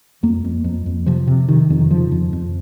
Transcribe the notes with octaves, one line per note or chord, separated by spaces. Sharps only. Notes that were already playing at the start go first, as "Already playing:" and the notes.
F2 A#3
F2
F2
F2
C3 F3
C3
C3 D#3
F2
D#3
C#3 F3
F2
F2